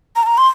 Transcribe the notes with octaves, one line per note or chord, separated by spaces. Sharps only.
A#5
A5
A#5
C6